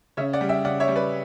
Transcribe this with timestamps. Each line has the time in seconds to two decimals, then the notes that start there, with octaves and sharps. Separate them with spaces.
0.17 C#3 C#5 E5
0.33 D5 F#5
0.41 G3
0.49 E5 G5
0.65 C#3 D5 F#5
0.80 C#5 E5
0.88 G3
0.96 B4 D5